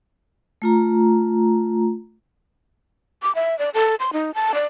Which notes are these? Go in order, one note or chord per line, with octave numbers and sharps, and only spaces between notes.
A3 F4 A#5
D6
E5
D5
A4
C6
D#4
A5
D5